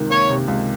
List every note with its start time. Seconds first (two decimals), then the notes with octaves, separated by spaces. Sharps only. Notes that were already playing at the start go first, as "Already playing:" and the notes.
Already playing: C#2 C3 D#3
0.10 A#3 C#5
0.29 C3
0.48 C#2